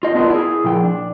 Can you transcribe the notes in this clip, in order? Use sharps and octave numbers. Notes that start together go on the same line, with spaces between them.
F4 D#5
B3 D4 F4 G#4 A#4 B4
E4 G#4
A#2 F3 G5
D4